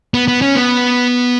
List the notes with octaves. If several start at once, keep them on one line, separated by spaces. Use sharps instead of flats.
B3
B3
C#4
B3